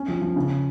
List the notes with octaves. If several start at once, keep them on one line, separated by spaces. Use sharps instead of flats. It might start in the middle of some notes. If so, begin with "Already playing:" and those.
Already playing: C#4
F3
F3
C#3